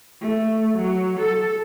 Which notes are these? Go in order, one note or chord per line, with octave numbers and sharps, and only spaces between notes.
A3
F#3
A4